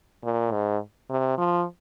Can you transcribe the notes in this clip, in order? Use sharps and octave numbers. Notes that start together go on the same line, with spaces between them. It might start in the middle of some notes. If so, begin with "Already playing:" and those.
A#2
G#2
C3
F3